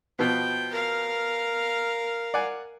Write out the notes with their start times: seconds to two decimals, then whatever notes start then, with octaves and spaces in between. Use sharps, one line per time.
0.19 B2 F3 B3 G5
0.71 A#4 F5
2.34 D5 F#5 G#5